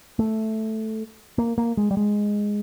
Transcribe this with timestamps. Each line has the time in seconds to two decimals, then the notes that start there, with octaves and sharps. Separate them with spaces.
0.19 A3
1.38 A#3
1.58 A#3
1.77 G#3
1.91 G3
1.97 G#3